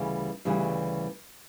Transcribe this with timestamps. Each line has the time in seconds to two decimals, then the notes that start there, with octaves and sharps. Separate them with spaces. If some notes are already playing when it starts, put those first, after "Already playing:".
Already playing: D2 C#3 E3 G3
0.45 D2 C#3 E3 G3